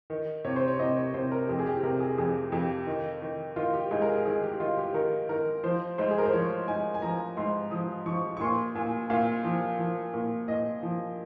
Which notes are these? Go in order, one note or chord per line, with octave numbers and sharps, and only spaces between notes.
D#3
C3 C#5
C5
C#5
C3 D#5
C#5
C3 C5
A#4
F2 G4
G#4
G4
C3 A#4
G#4
F2 G#4
F2 G4
D#3
D#3
D#3 F4
G4
G#2 G#4
A#4
G#4
D#3 G#4
G4
D#3 F4
G4
D#3 A#4
D#3 A#4
F3 C5
G#2 C5
G#4
A#4
C5
F3 C#5
G#2 G#5
G#5
F3 A#5
G#2 C6
F3 D#6
F3 C#6
C#6
A#2 C6
A#2 G#5
A#2 F5
F3
F3
A#2
A#2 D#5
F3